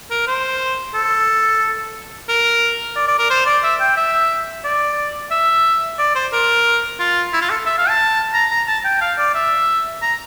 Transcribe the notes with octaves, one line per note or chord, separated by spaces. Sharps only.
A#4
C5
A4
A#4
D5
D5
A#4
C5
D5
E5
G5
E5
D5
E5
D5
C5
A#4
F4
E4
F4
A4
E5
F5
A5
A#5
A#5
A5
G5
F5
D5
E5
A#5